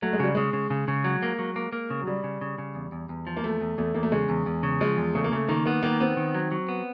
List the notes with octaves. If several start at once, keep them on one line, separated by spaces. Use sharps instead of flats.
F#3 A3
G#3
C#3 G3
C#3 G#3
C#3
C#3
C#3
F#3
A#3
F#3
A#3
A#3
C#3
F#3
C#3 G3
C#3
C#3
C#3
E2
E2
E2
F3
A#3
E2 A3
E2
E2 A3
E2 A#3
A3
C#3 G#3
E2
E2
C#3
F3 G#3
E2
C#3 A3
A#3
C#3 A3
D#3 A#3
A#3 B3
D#3 A#3
B3 C4
D#3
F#3
F#3
B3